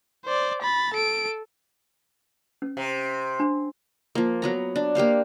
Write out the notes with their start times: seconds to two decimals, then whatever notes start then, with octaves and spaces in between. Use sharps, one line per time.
0.25 C5 D5
0.62 B5 A6
0.94 A4 D7
2.62 C#4
2.77 C3
3.40 D4
4.15 F3 A#3
4.42 F#3 B3 A#5
4.76 D4
4.95 A#3 G4 C5 F5